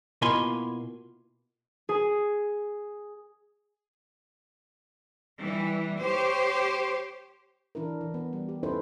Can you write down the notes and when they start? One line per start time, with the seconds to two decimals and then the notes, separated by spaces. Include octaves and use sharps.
0.22 B2 A#3 E4 F4 G#5 C6
1.89 G#4
5.40 E3 G3
6.01 G4 C5 C#5
7.75 E3 D4 E4 A#4
8.01 E3
8.14 B3
8.33 G3
8.49 G4
8.63 C#4 D#4 E4 A4 B4 C5